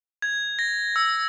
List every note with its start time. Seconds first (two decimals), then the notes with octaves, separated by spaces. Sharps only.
0.22 G#6
0.59 A#6
0.96 E6